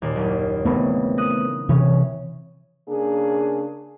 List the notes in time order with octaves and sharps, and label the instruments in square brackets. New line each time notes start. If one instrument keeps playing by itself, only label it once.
[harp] D#2 A#2
F#1
[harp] E1 C#3 [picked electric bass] A3 B3 C4
[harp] D#6 F#6 A#6
[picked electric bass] C3 E3 [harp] C#4
[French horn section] C#3 A#3 D4 G#4